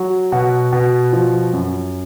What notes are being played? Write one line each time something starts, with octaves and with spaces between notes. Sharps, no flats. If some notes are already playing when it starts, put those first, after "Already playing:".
Already playing: F#3
B2 F#4
B2
F3
F#2